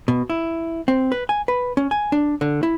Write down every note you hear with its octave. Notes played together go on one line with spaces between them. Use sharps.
B2
E4
C4
B4
G#5
B4
C#4
G#5
D4
D3
E4